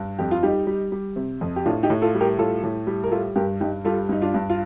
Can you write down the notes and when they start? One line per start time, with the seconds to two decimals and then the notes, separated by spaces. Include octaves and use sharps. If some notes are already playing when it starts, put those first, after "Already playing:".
Already playing: G2
0.19 F2 G4
0.31 F4
0.43 G3 D#4 G4
0.67 G3
0.92 G3
1.16 C3
1.41 F2
1.56 G4
1.65 A2 D4 F4
1.83 D#4 G4
1.90 A2
2.02 F4 A4
2.15 G3
2.20 G4 A#4
2.38 A2 F4 A4
2.64 A2
2.87 G3
3.03 A#4
3.12 G3 F4 A4
3.36 G2 G4 A#4
3.60 G2 D#4 G4
3.85 G3 F4 A4
4.09 G2 D#4
4.22 D4 F4
4.34 G2
4.50 F4